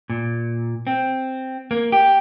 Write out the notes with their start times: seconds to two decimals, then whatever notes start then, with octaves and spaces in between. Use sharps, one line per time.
0.10 A#2
0.87 C4
1.71 A#3
1.92 G4